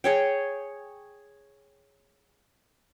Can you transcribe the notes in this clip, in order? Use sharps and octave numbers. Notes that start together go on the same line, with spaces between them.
G#4 C#5 G5